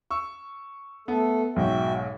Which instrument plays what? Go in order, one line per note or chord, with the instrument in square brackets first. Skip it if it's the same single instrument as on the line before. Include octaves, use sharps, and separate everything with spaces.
[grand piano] C#6 E6
[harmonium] A3 A4 [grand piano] B3
[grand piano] B1 G#2 [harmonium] F#4 E5 G5